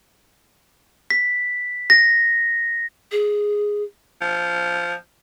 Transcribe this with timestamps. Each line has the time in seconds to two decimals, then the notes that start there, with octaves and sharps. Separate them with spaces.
1.10 B6
1.90 A#6
3.12 G#4
4.21 F3